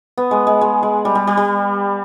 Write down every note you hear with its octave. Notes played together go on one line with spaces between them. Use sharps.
B3
G#3
G#3
G#3
G#3
G3
G3
G3
G3